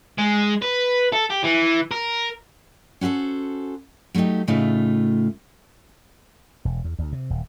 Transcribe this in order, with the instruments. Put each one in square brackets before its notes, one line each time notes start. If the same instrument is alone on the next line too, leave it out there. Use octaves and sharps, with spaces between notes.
[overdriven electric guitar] G#3
B4
A4
G4
E3
A#4
[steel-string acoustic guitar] C#4 F#4 G4 A4 C5
F#3 A3 D4 D#4 G4
A2 C#3 A3 D#4 F4
[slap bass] E1
E2
D2
C3
D#1